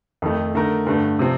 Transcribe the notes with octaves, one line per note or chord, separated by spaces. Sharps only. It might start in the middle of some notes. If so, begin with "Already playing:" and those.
F2 D#3 A3
D3 A3 D#4 A#4
G2 D3 A3
C3 F3 C4